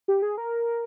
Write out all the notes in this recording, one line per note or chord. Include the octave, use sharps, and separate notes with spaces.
G4
G#4
A#4